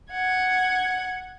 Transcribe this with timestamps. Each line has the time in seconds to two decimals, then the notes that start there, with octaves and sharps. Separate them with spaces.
0.11 F#5 G#6